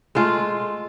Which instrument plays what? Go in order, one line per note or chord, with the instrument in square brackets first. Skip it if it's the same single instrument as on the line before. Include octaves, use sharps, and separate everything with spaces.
[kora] G#3 A3 F4